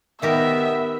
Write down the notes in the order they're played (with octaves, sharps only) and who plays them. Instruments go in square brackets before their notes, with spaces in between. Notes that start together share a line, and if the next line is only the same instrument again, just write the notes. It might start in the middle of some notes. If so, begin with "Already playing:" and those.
[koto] D#3 G4 A#4 [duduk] B3 [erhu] E5